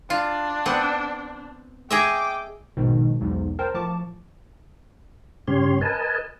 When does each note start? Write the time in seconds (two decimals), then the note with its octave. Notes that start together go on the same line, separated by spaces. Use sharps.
0.10 D4 F4
0.66 B3 C4 F#5
1.91 G#4 D#5 E5 G5 D6
2.77 A#1 G#2 B2 D#3
3.21 B1 E2 G#2
3.59 A#4 C5 G5 A5
3.74 A2 F3 A5 C#6 D6
5.48 G2 C#3 C#4 G4 C#5 C6
5.81 A#4 B4 D#5 G#5 A5